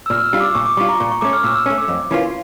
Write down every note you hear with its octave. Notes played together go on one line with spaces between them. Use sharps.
E6
A#2 F6
E6
G3 D4 F4
D6
A#2 C#6
D6
G3 D4 F4 C#6
A#5
A#2 C#6
C#6
A3 C#4 D6
F6
A#2 E6
E6
A3 C#4
D6
F2
E3 A#3 C#4 F4